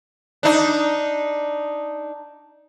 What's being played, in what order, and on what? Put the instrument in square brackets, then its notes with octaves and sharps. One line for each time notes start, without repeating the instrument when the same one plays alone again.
[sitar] D4 D#4